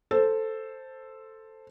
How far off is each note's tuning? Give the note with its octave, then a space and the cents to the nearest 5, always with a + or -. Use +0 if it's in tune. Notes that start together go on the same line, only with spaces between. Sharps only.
A4 +5 C5 +0